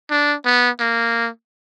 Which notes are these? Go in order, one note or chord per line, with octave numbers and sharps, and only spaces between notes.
D4
B3
A#3